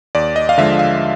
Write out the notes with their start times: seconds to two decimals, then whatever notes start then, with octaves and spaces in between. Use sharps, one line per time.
0.15 D#2 D5
0.36 D#5
0.49 F5
0.58 D3 F3 G#3 E5
0.79 F5